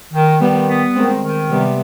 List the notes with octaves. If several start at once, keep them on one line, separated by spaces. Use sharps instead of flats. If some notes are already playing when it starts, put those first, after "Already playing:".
D#3
D#3 G3 B3
B3
D#3 G#3 C4
D#3
C3 G3 B3